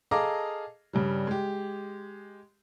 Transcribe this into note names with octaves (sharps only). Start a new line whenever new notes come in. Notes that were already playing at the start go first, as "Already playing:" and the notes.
G#4 A4 D#5 F5 A#5 D6
G2 C#3 G3
G#3 G4